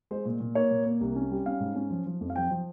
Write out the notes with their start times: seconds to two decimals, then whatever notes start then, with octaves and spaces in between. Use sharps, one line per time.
0.11 G#3 C5
0.25 A#2
0.40 A#2
0.55 A#3 C#5
0.71 A#2
0.85 A#3
1.01 C2
1.16 C#4
1.31 G3
1.46 C#4 F5
1.60 G#2
1.75 C#4
1.91 F3
2.06 F3
2.21 F2
2.30 F5
2.36 F3 G5
2.51 F3